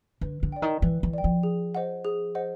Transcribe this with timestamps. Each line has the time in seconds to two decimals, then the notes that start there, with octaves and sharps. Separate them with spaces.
0.21 D3 B4
0.43 D3
0.52 D5 G5
0.62 D#3
0.82 E3 B4
1.03 E3
1.14 D5 G5
1.24 F3
1.43 G#4
1.75 C5 D#5 F#5
2.05 G#4
2.35 C5 D#5 F#5